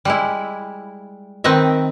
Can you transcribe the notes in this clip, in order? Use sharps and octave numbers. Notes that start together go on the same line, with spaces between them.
G3 G#3 E4
D#3 C4 B4 D#5 E5